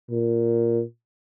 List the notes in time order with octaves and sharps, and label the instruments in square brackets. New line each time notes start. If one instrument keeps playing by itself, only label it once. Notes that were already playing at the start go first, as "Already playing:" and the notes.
[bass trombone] A#2